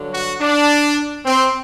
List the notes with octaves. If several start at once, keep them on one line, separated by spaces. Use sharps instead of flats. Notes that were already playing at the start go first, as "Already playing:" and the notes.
Already playing: G2 D3 F#3
F#4
D4
C4